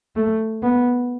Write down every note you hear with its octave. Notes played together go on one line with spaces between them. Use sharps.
A3
B3